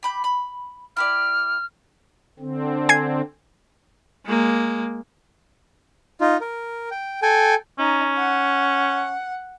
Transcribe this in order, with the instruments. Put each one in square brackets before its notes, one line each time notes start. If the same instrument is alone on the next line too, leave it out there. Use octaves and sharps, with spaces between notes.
[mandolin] G4 B5 G6
B5
[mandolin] E4 G4 D5 [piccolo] F6
[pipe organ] D3 C4
[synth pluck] G#5 G#6 C7
[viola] G#3 A#3
[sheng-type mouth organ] D#4 F4
A#4
G5
A4 G5 G#5
[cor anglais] C#4 [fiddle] D#4
[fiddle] F#5